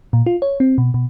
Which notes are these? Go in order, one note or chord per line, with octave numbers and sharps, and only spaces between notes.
A#2
F4
C#5
C4
B2
B2